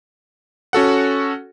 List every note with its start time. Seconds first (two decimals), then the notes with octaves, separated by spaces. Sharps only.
0.73 C#4 F#4 A4 F#5